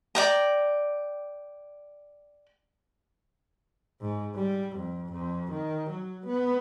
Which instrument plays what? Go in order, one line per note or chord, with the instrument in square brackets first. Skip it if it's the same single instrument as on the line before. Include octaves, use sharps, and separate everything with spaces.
[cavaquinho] D5 G5 A#5
[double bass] G#2
G3
F2
F2
D#3
F#3
B3